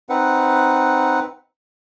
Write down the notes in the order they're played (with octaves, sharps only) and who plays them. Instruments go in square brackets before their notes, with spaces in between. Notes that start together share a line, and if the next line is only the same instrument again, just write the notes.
[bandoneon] C4 D#4 B4 F#5